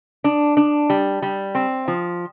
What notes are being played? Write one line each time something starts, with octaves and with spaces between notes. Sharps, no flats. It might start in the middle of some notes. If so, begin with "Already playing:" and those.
D4
D4
G3
G3
C4
F3